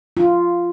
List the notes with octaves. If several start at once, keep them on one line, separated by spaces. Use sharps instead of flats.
F4